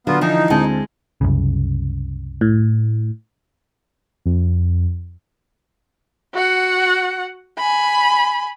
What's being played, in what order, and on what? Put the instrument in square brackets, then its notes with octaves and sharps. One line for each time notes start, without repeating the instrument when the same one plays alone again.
[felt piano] D3 [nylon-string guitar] F#3 [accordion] B3 F4
[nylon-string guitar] E3 F3 C4 [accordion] D#4
[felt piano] D2 C4 A5 [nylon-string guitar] G#3
[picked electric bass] C2 F#2 C#3
[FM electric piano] A2
[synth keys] F2
[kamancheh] F#4 F#5
G#5 B5